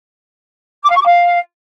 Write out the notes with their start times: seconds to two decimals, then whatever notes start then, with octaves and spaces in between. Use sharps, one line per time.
0.84 D6
0.90 F5
0.95 C#6
1.00 D6
1.06 F5